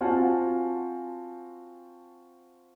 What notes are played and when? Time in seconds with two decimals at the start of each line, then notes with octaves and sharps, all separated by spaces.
0.01 C4 F4 F#4 F#5 G#5 A5